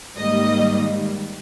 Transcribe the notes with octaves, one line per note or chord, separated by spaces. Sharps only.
G#2 D#3 G3 A#3 D#5